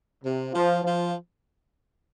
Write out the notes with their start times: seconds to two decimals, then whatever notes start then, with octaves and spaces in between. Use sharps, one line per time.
0.24 C3
0.53 F3
0.82 F3